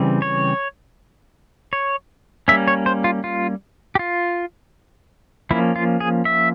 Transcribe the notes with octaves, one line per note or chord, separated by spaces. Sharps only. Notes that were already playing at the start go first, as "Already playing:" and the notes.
Already playing: C#3 E3 G3 C4
C#5
C#5
G3 A#3 C#4 E5
C#5
C5
F4
F4
G4
F4
F3 A#3 C#4 E4
F4
G#4
E5